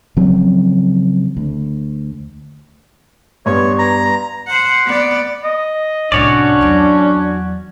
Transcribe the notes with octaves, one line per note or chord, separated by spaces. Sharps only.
C#3 F3 F#3 C4
D2
G2 B3 C#5 C6
A#5
C5 F#5
B3 D5
D#5
C2 A2 C#4 D4 F#4 C#5 D5
E2 F#3